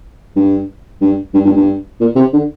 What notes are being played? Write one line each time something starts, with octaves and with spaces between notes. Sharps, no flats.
G2
G2
G2
G2
G2
A#2
C3
D3